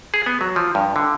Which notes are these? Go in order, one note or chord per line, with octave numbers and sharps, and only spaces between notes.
G#4
B3
F#3
F3
G2
D3